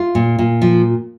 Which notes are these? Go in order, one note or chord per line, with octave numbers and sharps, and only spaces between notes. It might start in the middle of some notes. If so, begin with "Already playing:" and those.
Already playing: F4
A#2
A#2
F3